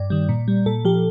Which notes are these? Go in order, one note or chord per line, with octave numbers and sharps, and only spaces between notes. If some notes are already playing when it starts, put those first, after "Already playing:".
Already playing: G2 D5
D#3 G3
A#2
G3
A#2 A4
F3 G4